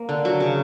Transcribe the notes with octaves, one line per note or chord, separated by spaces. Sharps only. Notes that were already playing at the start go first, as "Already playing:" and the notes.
Already playing: A#3
D3
F#3
C#3